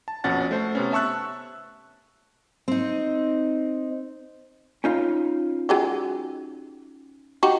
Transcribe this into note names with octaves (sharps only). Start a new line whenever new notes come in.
A5
A#1 F2 B2 C#4 F#5 A6
A3 C5
C3 B3 C#4
E5 A5 C#6 E6 F#6
C4 D#4
C#4 D#4 F4
F#3 G#3 G4
D#4 F#4 G4